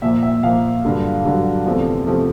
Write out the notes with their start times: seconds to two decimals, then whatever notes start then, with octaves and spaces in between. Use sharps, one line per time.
0.02 A#2 F3 A#3 E5
0.23 E5
0.43 A#2 F3 A#3 F5
0.84 G2 D3 F#3
1.24 G2 D3 F#3
1.66 E2 C3 F3 A3
2.07 C3 F3 A3